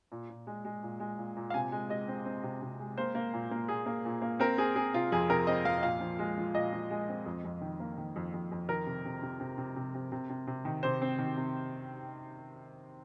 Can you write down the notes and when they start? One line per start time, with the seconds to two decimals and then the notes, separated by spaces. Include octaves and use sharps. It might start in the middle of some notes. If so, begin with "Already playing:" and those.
0.12 A#2
0.30 A#2
0.47 G#3
0.65 G#3
0.83 A#2
1.00 G#3
1.18 A#2
1.36 A#2
1.50 F5
1.54 C3 G#5
1.72 G#3
1.89 G#3 D#5
2.08 C4
2.25 C4
2.43 C3
2.62 C3
2.79 G#3
2.97 A#3 C5
3.15 A#3
3.33 A#2
3.51 A#3
3.68 A#2 G#4
3.86 A#3
4.05 A#2
4.22 A#3
4.40 C4 A#4
4.58 C4 G#4
4.76 C4 G#4
4.94 C3 F4
5.12 F2 G#4
5.29 C3 A#4
5.47 C4 D#5
5.65 F2 F5
5.83 A#2 F5
6.00 F3
6.19 G#3
6.37 F3
6.54 A#2 D#5
6.72 F3
6.91 G#3
7.09 C4
7.26 F2
7.44 F2
7.61 D#3
7.80 A#3
7.98 D#3
8.16 F2
8.34 F2
8.51 F2
8.69 D#3 A#4
8.86 C3
9.05 C3
9.22 C3
9.40 C3
9.58 C3
9.76 C3
9.95 C3
10.12 C3
10.30 C3
10.47 C3
10.65 D#3
10.83 C3 C5
11.02 C4
11.19 D#3
11.37 C3